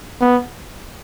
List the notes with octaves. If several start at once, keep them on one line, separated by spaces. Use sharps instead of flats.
B3